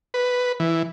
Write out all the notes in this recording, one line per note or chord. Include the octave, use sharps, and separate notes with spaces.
B4
E3